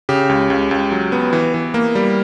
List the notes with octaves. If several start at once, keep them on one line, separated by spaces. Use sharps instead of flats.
C#3 G4
C#2
C#2
C#2
F#3
B3
E3
E3
A#3
G3